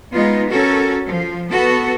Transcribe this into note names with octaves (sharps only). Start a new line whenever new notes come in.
G#3 B3 D#4 F4
C#4 F#4 A4 A#4
F3
B3 F#4 A4